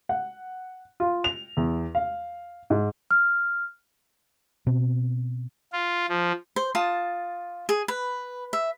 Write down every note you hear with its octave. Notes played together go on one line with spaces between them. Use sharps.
F#5
F4
F7
E2
F5
G#2
F6
B2 C4
F4
F3
C5
F4 A5 D#6
G#4
B4
E5